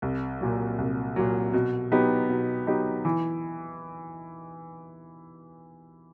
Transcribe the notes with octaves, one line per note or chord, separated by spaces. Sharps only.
C2
A#2 F#3
C2
A#2 F#3
B2
F#3 B3 D#4 G4
B2
F#3 B3 D#4 G4
E3